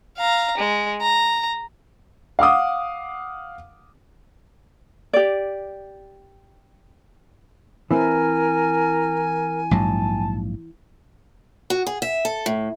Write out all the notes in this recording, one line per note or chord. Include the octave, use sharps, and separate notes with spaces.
F5 A#5
G#3
A#5
F5 F#5 D6 D#6
G4 D5
E3 C4 E4 A#4 G#5
A#1 G#2 F#3 A5
F#4
G#4
E5
A4
A2